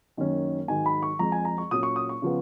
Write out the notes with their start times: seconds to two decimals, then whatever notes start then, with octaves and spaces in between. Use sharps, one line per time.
0.17 F#2 D#3 A#3 C#4
0.68 G#2 D#3 F#3 G#5
0.86 B5
1.03 C#6
1.19 F2 F3 G#3 A#5
1.32 G#5
1.45 A#5
1.58 C#6
1.71 A#2 F#3 C#4 D#6
1.83 C#6
1.96 D#6
2.09 C#6
2.22 C#3 F3 B3